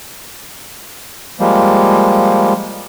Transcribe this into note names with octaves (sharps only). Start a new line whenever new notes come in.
F3 G3 G#3 A#3